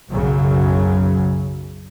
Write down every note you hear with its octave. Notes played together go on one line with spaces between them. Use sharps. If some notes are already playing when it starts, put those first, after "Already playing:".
B1 F#2 C#3 F#3